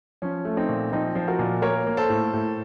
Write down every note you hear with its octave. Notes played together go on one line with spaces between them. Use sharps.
F3 C#4
A3
C4 D#4
A#2
F3 C4 D#4
F3 C5
F#4 A#4
A#2
A#3 A#4 C#5
A#3
A4 C5
A2
A2